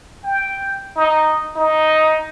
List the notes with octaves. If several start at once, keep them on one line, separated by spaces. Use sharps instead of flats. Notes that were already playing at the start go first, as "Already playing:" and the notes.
G5
D#4
D#4